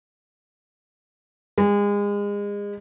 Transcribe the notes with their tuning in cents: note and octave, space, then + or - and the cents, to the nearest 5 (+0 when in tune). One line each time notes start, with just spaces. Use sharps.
G#3 -30